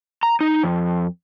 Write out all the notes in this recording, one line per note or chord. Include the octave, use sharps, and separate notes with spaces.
A#5
D#4
F2